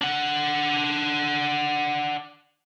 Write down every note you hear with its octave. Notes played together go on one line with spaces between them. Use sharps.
D4 F#5